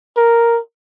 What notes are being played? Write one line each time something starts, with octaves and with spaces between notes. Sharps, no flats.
A#4